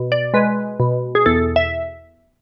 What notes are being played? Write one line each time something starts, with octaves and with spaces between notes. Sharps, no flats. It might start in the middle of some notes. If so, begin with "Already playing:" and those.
Already playing: B2
D5
G#3 B4
B2
G#4
E2 A4
E5